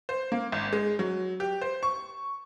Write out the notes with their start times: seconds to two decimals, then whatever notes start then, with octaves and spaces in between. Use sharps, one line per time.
0.09 C5
0.32 A#3
0.52 G#1
0.73 G#3
0.99 F#3
1.40 G4
1.62 C5
1.83 C#6